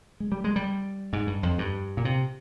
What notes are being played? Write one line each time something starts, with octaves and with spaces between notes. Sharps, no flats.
G#3
G3
G#3
G3
G#2
G2
F2
G2
A#2
C3